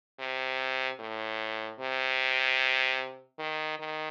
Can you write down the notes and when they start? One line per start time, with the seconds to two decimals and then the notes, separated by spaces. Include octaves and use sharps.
0.19 C3
0.99 A2
1.79 C3
3.39 D#3
3.79 D#3